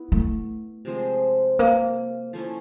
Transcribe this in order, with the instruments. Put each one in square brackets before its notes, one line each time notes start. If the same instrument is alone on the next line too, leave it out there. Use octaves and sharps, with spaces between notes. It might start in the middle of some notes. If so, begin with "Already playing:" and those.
Already playing: [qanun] B3 E4
[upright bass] A3
[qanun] C3 F3 G#3 C4
[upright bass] A#3
[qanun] F3 A3 C#4 E4